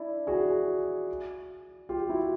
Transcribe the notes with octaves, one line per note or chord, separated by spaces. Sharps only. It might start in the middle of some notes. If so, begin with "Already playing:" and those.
Already playing: D4 E4
F#4 G#4
F4 G4
E4 F#4